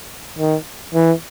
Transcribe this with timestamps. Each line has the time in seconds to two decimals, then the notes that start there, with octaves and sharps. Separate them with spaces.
0.39 D#3
0.95 E3